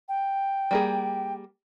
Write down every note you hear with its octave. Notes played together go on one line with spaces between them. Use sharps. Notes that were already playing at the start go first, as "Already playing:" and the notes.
G5
G3 A#3 G#4